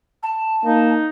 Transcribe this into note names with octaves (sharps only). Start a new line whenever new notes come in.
A5
A#3 D#4